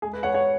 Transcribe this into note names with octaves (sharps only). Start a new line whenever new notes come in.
G#3 G#4
B4
G#3 C#5 F#5
C#5 F#5